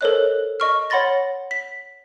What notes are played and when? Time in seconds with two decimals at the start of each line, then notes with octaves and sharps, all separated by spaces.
0.01 A4 A#4 C5 C#5 D#5 F#6
0.60 D#5 C#6 F6
0.90 C#5 F#5 B5 C6 A6 A#6
1.51 B6